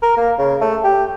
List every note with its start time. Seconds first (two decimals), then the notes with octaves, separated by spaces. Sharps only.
0.02 A#4
0.17 A#3
0.38 C#3
0.61 A3
0.84 G4